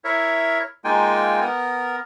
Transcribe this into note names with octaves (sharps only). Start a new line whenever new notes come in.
E4 A#4 C#5 E5
G#3 A#3 D#4 F4 G5 G#5
B3 A#4